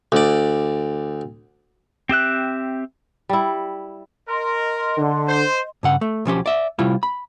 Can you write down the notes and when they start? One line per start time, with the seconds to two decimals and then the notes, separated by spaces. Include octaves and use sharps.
0.12 D2 D5
2.09 C4 G4 E5 F#6
3.29 G3 E4
4.29 A#4 D#5 C6
4.98 D3
5.28 C5
5.83 G2 C#3 F#5
6.01 A3
6.25 B1 F3 C#4 G4
6.46 D5 E5
6.79 C3 G3 E4 F4
7.03 B5